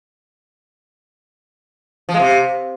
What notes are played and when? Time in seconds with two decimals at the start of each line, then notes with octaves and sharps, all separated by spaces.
2.09 F3
2.14 G#3
2.19 C3